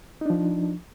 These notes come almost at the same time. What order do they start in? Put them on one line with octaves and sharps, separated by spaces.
D#4 D4 F3